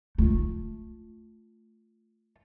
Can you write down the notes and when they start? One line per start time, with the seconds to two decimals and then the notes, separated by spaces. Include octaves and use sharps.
0.18 A3 F4